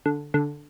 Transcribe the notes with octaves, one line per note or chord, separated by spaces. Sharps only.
D3
D3